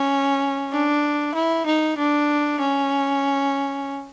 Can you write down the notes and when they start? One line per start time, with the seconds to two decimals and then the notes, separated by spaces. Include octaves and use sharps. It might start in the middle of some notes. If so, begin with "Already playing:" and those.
Already playing: C#4
0.72 D4
1.35 E4
1.66 D#4
1.98 D4
2.60 C#4